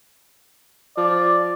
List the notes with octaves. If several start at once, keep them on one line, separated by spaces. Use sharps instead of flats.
F3 D5